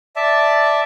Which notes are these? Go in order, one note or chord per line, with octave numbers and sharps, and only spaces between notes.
D5 E5 A5